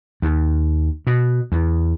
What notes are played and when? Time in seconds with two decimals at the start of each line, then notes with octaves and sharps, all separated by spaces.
0.22 D#2
1.07 B2
1.52 E2